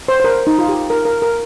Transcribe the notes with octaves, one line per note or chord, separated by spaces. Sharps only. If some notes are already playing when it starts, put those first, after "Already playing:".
C5
C5
A#4
D#4
F4
G4
A#4
A#4
A#4